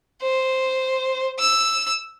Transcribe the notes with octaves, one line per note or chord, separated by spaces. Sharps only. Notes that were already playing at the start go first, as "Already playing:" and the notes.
C5
E6